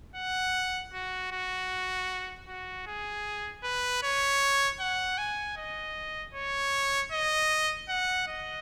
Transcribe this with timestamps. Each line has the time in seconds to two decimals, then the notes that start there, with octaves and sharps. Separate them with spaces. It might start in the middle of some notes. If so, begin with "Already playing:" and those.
0.16 F#5
0.93 F#4
1.32 F#4
2.48 F#4
2.87 G#4
3.64 B4
4.03 C#5
4.80 F#5
5.18 G#5
5.57 D#5
6.35 C#5
7.12 D#5
7.89 F#5
8.28 D#5